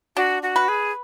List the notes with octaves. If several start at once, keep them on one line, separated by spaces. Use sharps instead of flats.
D4 F#4
F#4
B4
G#4